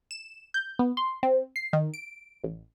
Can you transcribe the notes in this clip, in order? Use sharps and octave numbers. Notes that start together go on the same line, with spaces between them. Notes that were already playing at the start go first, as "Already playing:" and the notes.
E7
G6
B3
C6
C4
C7
D#3
D7
A1